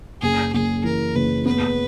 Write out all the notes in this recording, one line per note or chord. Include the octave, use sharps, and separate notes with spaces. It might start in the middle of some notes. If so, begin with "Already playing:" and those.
F#1 G#4
F#1 G#4
E3 A#4
F#1 B4
B3 B4